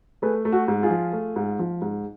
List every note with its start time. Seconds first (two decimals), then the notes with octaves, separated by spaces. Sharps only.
0.22 A3 G#4 B4
0.45 A3
0.52 F#4 A4
0.68 G#2
0.83 F4 G#4
0.90 F3
1.13 A3
1.36 G#2
1.59 F3
1.82 G#2